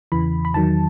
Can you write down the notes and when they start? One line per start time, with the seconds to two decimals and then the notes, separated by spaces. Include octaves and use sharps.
0.12 E2 C#3 E3 B5
0.45 B5
0.54 E2 D#3 F#3 A5